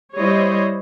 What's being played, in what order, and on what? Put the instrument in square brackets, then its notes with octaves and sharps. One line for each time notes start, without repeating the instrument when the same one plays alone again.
[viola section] G3 E4 C5 C#5 D#5